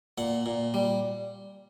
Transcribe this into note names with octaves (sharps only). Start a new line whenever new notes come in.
A#2 F#5
A#2
G3